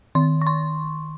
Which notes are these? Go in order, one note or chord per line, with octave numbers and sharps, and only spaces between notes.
D#3 C6
C#6
C6